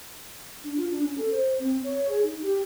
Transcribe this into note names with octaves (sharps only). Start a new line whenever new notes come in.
D4
F4
D4
C#4
A4
C5
C4
C#5
G#4
D#4
G4